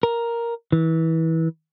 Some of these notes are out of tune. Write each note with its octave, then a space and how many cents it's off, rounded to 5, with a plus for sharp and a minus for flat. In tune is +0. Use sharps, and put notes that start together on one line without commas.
A#4 +5
E3 -25